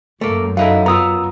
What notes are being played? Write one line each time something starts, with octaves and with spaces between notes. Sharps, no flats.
F#2 A3 A#3
F#3 D#4 E4 A4 E5 F5
B3 F4 A#5 D#6 E6